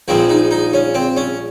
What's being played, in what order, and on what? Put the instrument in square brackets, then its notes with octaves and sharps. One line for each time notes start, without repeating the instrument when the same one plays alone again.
[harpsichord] A#1 A#2 F3 G#3 C4
D#4
D#4
C#4
C4
C#4